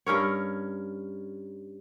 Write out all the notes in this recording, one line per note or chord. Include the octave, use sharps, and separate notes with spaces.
G2 C#4 A#4 C#5